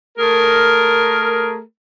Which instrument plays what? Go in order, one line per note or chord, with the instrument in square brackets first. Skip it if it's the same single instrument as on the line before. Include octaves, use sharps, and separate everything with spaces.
[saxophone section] A3 G#4 A#4